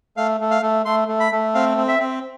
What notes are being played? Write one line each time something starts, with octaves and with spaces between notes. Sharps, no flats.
A3 F5
A3
F5
A3
A3 C6
A3
B5
A3
C4 F5
C4
E5
C4